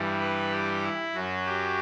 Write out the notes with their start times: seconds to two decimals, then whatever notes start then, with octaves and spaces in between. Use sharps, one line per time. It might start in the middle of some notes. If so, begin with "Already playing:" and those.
Already playing: G2 E3 G3
0.20 B4
0.51 G4
0.83 E4
1.14 F#2 F#3 F#4
1.46 G4